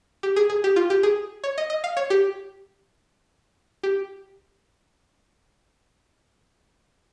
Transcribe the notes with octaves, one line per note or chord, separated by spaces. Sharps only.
G4
G#4
G#4
G4
F4
G4
G#4
C#5
D#5
D#5
F5
C#5
G4
G4